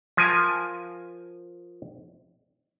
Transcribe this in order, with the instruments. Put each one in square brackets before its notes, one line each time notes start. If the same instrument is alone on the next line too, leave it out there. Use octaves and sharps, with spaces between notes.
[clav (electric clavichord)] F3 A#4 G#5